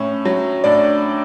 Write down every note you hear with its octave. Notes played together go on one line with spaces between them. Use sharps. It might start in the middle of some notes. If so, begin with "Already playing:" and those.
Already playing: A2 C#4
F#3
A2 D4 D5